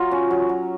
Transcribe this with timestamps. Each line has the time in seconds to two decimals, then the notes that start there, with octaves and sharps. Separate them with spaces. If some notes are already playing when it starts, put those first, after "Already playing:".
Already playing: F#3 F4 A#5
0.11 C#4
0.31 F#3
0.49 F#3